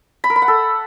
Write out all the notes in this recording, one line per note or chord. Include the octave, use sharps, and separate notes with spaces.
B5
A#4
B5
F#5
A4